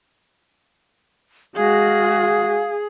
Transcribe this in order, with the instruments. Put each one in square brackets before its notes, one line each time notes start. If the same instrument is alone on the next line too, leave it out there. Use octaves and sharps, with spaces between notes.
[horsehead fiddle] G#3 F#4 [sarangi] G#4 [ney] F5